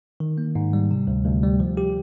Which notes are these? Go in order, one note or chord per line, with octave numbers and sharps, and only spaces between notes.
D#3
A#3
G#2
G3
C3
D2
D2
G3
F3
G4